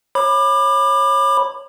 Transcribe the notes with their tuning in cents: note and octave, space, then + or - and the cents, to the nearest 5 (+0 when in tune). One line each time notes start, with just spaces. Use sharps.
C#5 -20 B5 +0 D6 +30